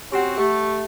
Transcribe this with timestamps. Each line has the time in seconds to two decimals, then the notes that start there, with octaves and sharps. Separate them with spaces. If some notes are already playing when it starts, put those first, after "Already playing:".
0.12 C4 C#4 F#4 G4 F#5
0.38 A3 G4